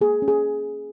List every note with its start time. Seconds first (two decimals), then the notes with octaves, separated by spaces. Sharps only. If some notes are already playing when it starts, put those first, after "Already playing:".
0.01 A#3 G#4
0.22 C#4
0.28 G#4